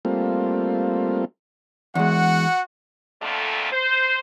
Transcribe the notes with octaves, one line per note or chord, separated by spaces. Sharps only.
G3 A3 A#3 C4 F4
E2 G#3 F#4 F#5
F2 A#2 D3 A3
C5